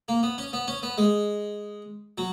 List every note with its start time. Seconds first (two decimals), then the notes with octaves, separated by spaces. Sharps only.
0.08 A#3
0.23 B3
0.38 C#4
0.53 B3
0.68 C#4
0.83 B3
0.98 G#3
2.18 F#3